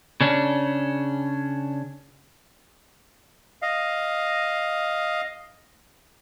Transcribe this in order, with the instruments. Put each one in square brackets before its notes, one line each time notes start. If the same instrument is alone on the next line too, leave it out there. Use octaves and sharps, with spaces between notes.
[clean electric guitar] C#3 C#4 D4
[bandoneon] D#5 F5